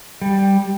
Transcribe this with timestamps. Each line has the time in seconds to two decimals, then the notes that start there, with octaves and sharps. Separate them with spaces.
0.22 G3